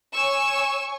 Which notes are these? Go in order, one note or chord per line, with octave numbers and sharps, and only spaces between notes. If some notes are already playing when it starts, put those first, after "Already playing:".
C#5 G#5 C#6 E6 E7